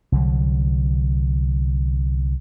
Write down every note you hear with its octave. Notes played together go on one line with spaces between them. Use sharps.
C2 D3 F#3